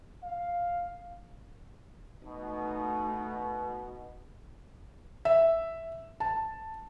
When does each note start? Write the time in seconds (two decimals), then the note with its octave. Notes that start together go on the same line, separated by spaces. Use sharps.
0.23 F5
2.25 B2 A3 D#4
5.25 E5
6.20 A5